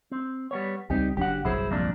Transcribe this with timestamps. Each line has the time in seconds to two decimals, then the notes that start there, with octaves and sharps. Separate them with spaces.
0.12 C4
0.51 G3 B3 C#5
0.90 C#2 G3 C4 D#4 G4
1.17 F#1 F#3 D4 G4 F#5
1.45 G1 C2 F#3 E4 G#4 C5
1.71 F2 A#2 D4